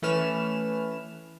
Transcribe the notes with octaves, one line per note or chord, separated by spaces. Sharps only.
E3 A3 C#4 B4 F6 E7